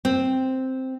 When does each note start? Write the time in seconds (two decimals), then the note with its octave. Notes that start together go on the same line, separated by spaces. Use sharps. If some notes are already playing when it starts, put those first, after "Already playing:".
0.05 C4